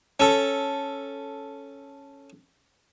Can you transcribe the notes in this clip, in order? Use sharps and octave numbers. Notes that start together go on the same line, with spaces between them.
C#4 A4